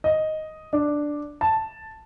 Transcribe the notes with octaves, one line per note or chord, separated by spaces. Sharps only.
D#5
D4
A5